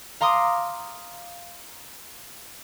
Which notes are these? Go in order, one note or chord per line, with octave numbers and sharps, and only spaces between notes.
F5 A#5 C6 D6 D#6